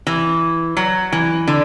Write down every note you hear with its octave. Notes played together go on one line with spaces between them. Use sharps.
E3
F#3
E3
D3